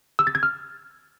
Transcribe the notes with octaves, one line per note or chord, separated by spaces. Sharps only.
E6
A6
G#6
F6